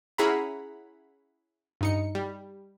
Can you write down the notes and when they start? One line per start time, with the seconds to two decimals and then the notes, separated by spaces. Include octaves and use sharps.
0.18 C#4 E4 G#4 F#5 A#5 B5
1.81 G2 D#4 C#7
2.15 G3